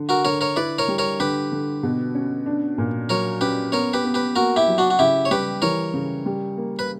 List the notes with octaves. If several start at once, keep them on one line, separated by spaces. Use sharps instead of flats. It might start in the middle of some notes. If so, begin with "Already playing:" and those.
Already playing: D3
F#4 A#4
D3 A#4 C#5
A#4 C#5
E4 B4 D5
A#4 C#5
G3
A#4 C#5
D3 G4 B4
D3
B2
C#4
D4
A#2
F#3 A#4 C#5
C#4 G4 B4
B3 A#4 C#5
G4 B4
B3
G4 B4
A#3 F#4 A#4
E4 G4
F#3
D4 F#4
F#4
C#3 E4 G4
C#5
G3 G4 B4
E3 A#4 C#5
C#3
G3
A#3
B4